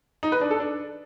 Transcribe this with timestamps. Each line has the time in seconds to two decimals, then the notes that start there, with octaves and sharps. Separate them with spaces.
0.23 D#4
0.32 B4
0.41 D4
0.51 A4
0.60 D4